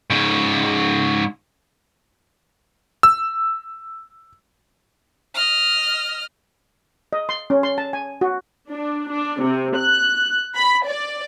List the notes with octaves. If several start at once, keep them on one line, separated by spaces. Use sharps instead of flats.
G#2 C#3
E6
D#5 F6
D#5
C6
C#4
C6
A5
G#5
F#4
D4
D4
C3
F#6
B5
D5